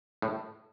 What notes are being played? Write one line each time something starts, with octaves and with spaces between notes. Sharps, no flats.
A2